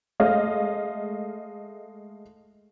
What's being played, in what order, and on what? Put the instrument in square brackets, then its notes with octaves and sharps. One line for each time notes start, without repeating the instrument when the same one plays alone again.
[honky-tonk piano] G#3 A3 D#5 F5